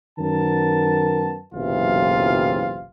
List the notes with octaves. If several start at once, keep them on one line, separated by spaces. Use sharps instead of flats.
F#2 D#3 B3 A#4 A5
F#1 B1 C3 E3 F4 F5